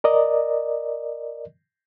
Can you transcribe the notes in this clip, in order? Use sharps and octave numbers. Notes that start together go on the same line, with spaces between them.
A#4 D5 D#5